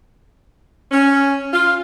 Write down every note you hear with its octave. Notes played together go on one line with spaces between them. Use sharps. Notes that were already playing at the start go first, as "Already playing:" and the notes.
C#4
F4